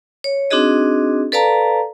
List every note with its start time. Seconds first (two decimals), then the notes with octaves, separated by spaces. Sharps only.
0.24 C#5
0.51 C4 D4 D#4 F#4 G#4 D#5
1.32 A4 B4 D5 F5 A5 A#5